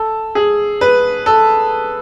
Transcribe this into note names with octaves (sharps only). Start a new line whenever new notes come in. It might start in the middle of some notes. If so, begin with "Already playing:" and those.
Already playing: A4
G#4
B4
A4